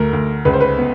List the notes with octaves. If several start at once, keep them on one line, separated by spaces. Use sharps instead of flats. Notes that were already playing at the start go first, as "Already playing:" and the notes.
Already playing: D2 A3 A#4
D2
C#2 B4
C5
B4
B3